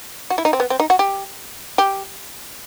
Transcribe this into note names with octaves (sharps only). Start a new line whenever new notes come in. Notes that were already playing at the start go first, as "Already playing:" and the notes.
F#4
E4
D#4
C4
B3
C4
D#4
F#4
G4
G4